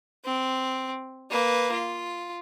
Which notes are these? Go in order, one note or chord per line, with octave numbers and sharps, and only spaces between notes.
C4
A#3 B4
F4